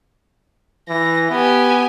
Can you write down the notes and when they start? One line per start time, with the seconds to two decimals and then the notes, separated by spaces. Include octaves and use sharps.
0.89 E3 A#6
1.30 B3 G4 G#5